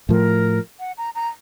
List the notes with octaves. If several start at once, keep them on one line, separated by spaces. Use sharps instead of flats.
A2 F3 A3 A#4
F#5
A#5
A#5